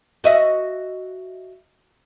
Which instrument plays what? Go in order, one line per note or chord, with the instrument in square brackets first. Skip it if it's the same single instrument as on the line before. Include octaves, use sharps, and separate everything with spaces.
[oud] F#4 D#5 E5